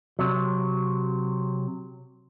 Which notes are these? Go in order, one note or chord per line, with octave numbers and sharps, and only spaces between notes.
C3 F#3